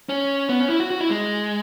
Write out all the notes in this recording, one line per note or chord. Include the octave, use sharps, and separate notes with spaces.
C#4
B3
C#4
E4
F#4
F#4
E4
G#3